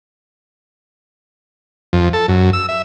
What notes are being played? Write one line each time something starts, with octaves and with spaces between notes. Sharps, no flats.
F2
A4
F#2
E6
E5